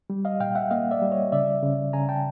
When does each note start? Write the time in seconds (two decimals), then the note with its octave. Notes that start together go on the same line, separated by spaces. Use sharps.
0.10 G3
0.25 D#5 F5
0.40 A#2 F5 G5
0.55 E5 F#5
0.71 A#3 D#5 F5
0.91 D5 E5
1.02 G3
1.11 C#5 D#5
1.32 C#3 D5 E5
1.62 C#3
1.93 C#3 G#5 A#5
2.09 G5 A5